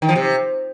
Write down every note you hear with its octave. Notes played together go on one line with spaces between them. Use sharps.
D#3
F3
C3